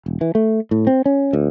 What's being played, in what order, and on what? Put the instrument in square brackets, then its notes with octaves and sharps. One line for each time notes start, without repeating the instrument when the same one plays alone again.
[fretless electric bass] E1
E3
A3
A2
C4
C#4
D2